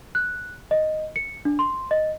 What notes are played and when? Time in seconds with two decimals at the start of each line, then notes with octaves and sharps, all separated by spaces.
0.15 F#6
0.71 D#5
1.16 C#7
1.45 D4
1.59 C6
1.91 D#5